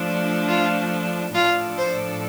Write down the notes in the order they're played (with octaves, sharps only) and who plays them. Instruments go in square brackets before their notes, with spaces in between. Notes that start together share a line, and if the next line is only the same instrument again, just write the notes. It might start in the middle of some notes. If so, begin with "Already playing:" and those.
Already playing: [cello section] F3 A3 D4
[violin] F4
[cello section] A2 F3 D4 A4 D5 [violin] F4
[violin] C5